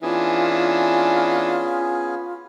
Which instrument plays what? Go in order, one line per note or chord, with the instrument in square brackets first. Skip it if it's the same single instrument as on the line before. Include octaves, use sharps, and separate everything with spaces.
[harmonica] E3 D4 [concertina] B3 C#4 G#4 [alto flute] F4